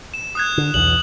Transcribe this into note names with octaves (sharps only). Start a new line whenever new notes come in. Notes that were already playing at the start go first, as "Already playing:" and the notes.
E7
D#6 F#6 G#6
D3
B1 E2 F#7